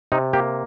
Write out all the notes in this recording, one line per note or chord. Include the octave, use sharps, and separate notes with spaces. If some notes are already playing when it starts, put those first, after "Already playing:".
C3 D#4
A#3 G4